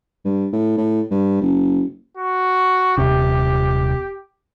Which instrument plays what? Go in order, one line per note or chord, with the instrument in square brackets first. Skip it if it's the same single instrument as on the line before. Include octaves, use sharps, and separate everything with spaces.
[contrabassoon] G2
A2
A2
G2
F#1
[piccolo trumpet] F#4
[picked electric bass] D#1 C3 [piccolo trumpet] G4